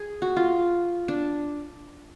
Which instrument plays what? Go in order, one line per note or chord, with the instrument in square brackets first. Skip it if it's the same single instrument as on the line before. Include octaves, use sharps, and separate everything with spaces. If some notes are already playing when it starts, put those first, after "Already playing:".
Already playing: [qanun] G#4
F#4
F4
D4